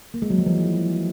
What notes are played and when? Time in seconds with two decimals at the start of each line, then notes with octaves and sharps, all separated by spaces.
0.14 A#3
0.22 G#3
0.30 F#3
0.38 F3
0.47 E3